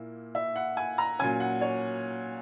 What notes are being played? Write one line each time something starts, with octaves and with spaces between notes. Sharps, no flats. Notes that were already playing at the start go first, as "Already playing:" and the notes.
Already playing: A#2 A#3 E4
E5
F#5
G#5
A#5
A#2 F#3 C#4 G#5
F#5
C#5